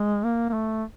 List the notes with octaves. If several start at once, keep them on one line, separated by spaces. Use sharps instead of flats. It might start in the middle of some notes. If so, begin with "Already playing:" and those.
Already playing: G#3
A#3
A#3
A3